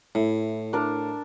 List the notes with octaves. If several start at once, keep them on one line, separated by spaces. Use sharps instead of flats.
A2 E4
D4 A#4 A5